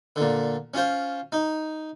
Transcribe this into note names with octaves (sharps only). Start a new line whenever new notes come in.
A#2 D3
C#4 F4 C5
D#4